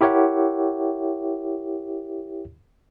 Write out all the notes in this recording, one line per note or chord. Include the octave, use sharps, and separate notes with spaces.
E4 G4 A#4 C#5 E5 F#5